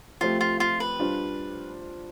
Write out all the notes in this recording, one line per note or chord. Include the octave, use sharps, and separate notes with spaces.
F3 A3 C4 F4 G4
F4
F4
B4
G3 D4 F4 C5